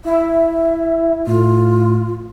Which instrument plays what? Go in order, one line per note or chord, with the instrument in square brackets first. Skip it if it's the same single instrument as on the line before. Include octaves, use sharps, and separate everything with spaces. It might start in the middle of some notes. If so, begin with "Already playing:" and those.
[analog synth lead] E4 [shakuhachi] E5
[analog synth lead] A2 [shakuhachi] F4